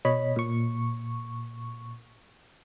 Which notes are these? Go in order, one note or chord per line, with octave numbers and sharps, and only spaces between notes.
B2 C#5 D#5 B5
A#2 C#6